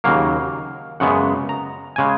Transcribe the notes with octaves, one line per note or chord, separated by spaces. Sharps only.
D#2 C#3 F#3 A#3 F5
F#2 C#3 G#3 B3 F#5
A#5
C#3 G#3 G#5